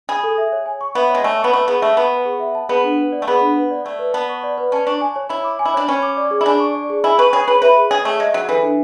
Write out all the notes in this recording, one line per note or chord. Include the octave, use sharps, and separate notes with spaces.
G#4 B5
A4
E5
C#5
G#5
C#6
B3 E5
C#5
G#3
A3 G#5
B3 C#6
A3 B4
B3 G#4
A3 E5
B3 A5
B4
G#4
E5
A5
B3 G#4
D4
B4
D5
A3
B3 G#4
D4
B4
D5
A3 D5
B4
B3 A5
C#6
D5
B4
C#4 A5
D4 C#6
G#5
C#5
E4 B5
D6
G#5
E4
D4 C#5
C#4 B5
D6
D5
G#4
E4
D4 G#5
C#6
D5
G#4
E4 G#5
B4 C#6
G#4 C#5
G#4 B4
B4 E5
G#4
G#4 C#5
A3 G#4
G#3 E5
F#3 G#4
E3 A4
D4